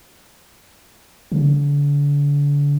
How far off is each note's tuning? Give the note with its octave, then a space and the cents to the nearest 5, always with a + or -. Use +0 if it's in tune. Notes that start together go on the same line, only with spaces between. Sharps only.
D3 -35